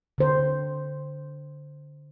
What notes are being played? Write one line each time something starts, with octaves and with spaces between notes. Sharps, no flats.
D3 C5